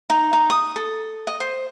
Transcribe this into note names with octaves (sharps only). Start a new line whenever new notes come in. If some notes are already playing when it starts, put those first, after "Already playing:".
D#4
D#4
D#6
A4
D#5
C5